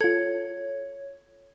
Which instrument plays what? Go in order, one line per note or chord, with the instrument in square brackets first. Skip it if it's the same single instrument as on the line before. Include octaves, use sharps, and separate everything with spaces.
[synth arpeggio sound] F4 A4 [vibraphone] C#5 [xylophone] G#6